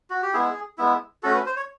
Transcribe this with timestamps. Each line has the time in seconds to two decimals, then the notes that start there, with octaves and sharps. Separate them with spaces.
0.10 F#4
0.23 G4
0.33 G#3 B3 E4 G#4
0.78 G#3 B3 E4
1.23 A3 C#4 F#4 A4
1.34 B4
1.46 C5
1.57 C#5